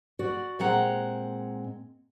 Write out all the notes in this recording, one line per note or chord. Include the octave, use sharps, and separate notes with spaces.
F#4 D5
A#2 G#3 C4 F#5 A#5